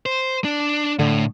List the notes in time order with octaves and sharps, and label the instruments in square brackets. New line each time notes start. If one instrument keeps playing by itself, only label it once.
[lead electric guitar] C5
D4
[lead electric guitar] A2 [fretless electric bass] D3